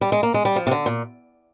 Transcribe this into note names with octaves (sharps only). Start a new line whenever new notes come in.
G3
G#3
A#3
G#3
G3
F3
C3
D3
A#2